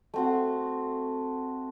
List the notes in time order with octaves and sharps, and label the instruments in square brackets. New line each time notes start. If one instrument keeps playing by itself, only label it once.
[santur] A3 C4 F#4